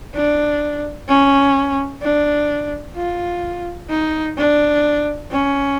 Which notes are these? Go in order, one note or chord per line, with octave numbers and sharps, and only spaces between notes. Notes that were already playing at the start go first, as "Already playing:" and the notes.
D4
C#4
D4
F4
D#4
D4
C#4